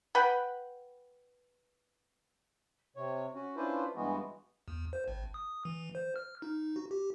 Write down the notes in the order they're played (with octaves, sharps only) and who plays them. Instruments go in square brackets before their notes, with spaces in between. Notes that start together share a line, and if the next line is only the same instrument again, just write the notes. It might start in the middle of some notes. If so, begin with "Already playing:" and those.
[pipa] B4 F#5 G5 B5
[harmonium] C3 C#5
C#4 F#4
C#4 D4 E4 F4 B4 C5
G2 E3 G#3 B3 F#4
[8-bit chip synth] E2
C5
G#1
D#6
E3
C5
F6
D#4
F#4
G4